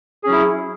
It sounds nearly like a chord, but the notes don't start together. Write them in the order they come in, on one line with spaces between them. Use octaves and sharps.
G#4 C#4 F#3 E4